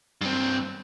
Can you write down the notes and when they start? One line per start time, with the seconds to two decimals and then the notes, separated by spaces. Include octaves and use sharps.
0.21 G2 C4